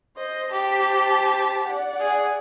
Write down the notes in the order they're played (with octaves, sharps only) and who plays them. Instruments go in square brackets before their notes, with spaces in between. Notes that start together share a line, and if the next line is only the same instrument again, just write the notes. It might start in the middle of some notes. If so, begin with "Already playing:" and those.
[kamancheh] C5 [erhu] D#5
[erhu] G4 [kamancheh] C5 A5
[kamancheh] D5 F#5
[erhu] G#4